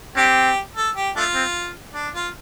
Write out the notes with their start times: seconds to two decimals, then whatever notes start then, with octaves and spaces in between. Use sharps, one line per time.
0.16 C4 D4 G4
0.76 A4
0.96 G4
1.16 A3 D4 F4
1.35 C4
1.94 D4
2.14 F4